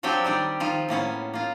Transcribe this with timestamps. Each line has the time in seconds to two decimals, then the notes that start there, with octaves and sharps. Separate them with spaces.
0.03 F3 F#3 C4 D4 G4 G5
0.24 D#3 G3 G4 D5
0.60 D#3 F3 F4
0.89 A2 A#3 B3 C#4
1.34 A#3 F4